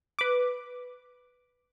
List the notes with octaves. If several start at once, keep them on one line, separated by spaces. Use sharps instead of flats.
B4 D6